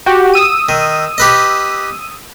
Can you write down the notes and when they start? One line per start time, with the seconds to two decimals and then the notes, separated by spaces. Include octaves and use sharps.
0.06 F#4 G4
0.34 D#6 E6 D#7
0.69 D#3
1.18 G4 B4 D#5